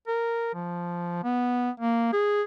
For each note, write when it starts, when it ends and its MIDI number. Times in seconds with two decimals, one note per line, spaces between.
0.07 0.52 70
0.54 1.22 53
1.24 1.70 59
1.80 2.08 58
2.13 2.42 68